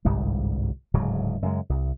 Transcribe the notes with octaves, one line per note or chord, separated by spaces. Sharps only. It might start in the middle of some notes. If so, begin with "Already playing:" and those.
G1 C2 G#2 G3
D1 G#2 C#3 F#3
F#2 C#3 G#3
C2